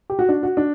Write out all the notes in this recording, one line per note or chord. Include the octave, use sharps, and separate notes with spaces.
G4
F#4
D4
F#4
D4